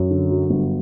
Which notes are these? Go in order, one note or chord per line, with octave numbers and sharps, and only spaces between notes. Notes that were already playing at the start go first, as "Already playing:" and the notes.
Already playing: F#2 C#5
D3
F#3
G1